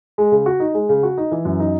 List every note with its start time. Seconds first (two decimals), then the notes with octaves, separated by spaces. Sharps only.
0.18 G#3
0.32 C#3
0.46 F#4
0.60 D#4
0.74 G#3
0.89 C#3
1.03 F#4
1.18 D#4
1.31 E3
1.45 F#2
1.60 D#4